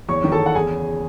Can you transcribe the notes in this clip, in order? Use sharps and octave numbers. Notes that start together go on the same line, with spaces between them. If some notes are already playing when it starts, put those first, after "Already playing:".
E2 C#5 C#6
D#3
A4 A5
E2
F#5
E2 G#4 G#5
C#3